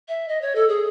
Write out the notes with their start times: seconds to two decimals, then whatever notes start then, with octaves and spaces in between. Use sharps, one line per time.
0.08 E5
0.29 D#5
0.41 C#5
0.55 A4
0.69 G#4